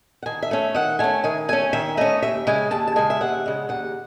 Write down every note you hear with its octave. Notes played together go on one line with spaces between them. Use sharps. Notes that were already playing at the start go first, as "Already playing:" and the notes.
F#5
D#3 G#5
E5
A3 C#4
D#3 F#5
A3 C#4 G#5
D#3 G#5
A3 C#4 G#5
D#3 E5
A3 C#4 D#5
D#2 E5
C#3 G#3 G#5
D#2 A5
A5
C#3 G#3 G#5
E5
D#2 F#5
C#3 G#3
D#2 F#5